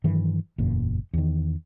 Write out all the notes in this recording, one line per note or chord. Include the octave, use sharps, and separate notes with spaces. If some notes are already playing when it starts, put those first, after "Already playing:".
G2 D#3 E3 F#3
F#1 E2 A#2
E2 D#3